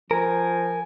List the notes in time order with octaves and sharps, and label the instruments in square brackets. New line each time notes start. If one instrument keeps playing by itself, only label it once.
[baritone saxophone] F3 [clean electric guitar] A#4 [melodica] G#5